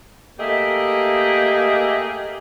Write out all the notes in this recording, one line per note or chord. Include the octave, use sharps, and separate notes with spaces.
A3 A#3 G4 G#4 D#5 E5